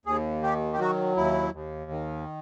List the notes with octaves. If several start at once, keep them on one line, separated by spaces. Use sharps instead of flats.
D#2 G#4
D#3 G4
G4
F#3 F#4
D#2 E4
D#2
D#3